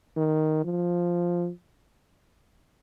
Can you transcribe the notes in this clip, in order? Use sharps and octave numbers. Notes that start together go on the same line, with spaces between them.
D#3
F3